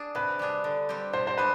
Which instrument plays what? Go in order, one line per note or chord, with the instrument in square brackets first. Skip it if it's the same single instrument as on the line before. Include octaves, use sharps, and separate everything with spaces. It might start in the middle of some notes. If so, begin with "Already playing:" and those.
Already playing: [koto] D4 G#4
[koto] C3 [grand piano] B4
[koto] G3 D4 G#4
D3
G3 C4 G4
[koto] B2 [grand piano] C5
[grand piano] C5
[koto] G#3 D4 [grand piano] B4